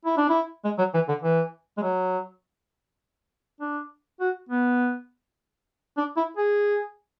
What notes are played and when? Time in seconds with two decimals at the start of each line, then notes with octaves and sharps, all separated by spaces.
0.05 E4
0.17 D4
0.29 E4
0.64 G#3
0.78 F#3
0.94 E3
1.08 D3
1.23 E3
1.78 G#3
1.83 F#3
3.61 D4
4.20 F#4
4.49 B3
5.97 D4
6.17 E4
6.37 G#4